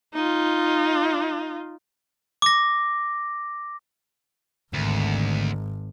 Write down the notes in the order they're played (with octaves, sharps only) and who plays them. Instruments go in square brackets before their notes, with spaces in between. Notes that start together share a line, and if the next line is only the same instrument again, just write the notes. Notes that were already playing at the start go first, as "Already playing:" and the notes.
[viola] D#4 F4
[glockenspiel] D6 A#6
[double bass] G#1 [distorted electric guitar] D2